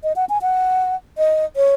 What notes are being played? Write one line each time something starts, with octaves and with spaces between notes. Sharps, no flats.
D#5
F#5
G#5
F#5
D#5
C#5